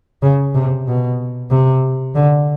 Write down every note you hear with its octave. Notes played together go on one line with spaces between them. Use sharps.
C#3
C3
B2
C3
D3